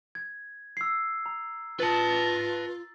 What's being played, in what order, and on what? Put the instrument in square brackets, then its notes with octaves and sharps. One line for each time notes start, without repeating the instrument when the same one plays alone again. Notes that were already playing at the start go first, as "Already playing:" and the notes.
[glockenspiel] G#6
E6 C7
A#5
[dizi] F4 [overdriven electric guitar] B4 A5 [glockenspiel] A6 F#7